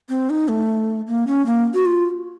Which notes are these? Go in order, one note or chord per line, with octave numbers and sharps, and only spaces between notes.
C4
D#4
A3
A#3
C#4
A#3
F#4
F4